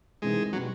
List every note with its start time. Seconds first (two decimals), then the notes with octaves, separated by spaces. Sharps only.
0.22 E2 C3 D#3 G#3
0.53 B2 F#3 G3